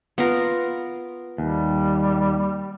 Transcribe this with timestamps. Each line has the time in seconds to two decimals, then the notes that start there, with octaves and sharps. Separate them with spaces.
0.18 B3 F4 A#4
1.38 D#2 G3